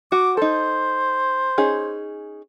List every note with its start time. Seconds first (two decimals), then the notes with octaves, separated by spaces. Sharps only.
0.12 F#4 D6
0.37 D#4 A4 C5
1.58 C#4 D#4 G#4